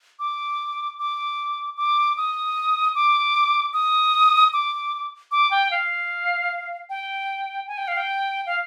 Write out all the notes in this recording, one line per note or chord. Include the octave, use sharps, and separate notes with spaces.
D6
D6
D6
D#6
D6
D#6
D6
D6
G5
F5
G5
G#5
G5
F5
G5
F5